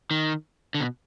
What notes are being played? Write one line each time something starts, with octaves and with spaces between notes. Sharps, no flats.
D#3
D3
B2